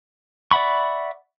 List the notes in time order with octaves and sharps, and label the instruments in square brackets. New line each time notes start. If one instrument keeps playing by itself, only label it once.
[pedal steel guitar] D5 E5 F#5 B5 C#6